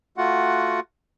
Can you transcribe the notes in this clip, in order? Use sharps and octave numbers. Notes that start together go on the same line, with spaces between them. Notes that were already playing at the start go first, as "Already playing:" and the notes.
A3 F4 F#4 F#5